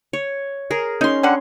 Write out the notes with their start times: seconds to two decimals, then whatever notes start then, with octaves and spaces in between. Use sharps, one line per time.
0.13 C#5
0.71 G#4 A#4
1.01 C#4 D#4 C6
1.23 D3 G3 F#5